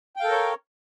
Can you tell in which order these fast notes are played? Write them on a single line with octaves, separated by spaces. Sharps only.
G5 F5 A4 A#4 C#5